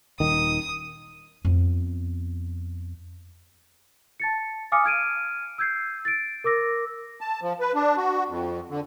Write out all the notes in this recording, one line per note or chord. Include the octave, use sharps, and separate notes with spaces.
D#1 D#3 D#6
F2 B3
A5 A6 C#7
F5 G#5 D6 D#6 F6 C#7
F6 G#6 D7 D#7
E6 G6 G#6 C7
A6 D7
A#4 D6 E6 A#6
A5
F3
B4
D4
F#4
F2
D3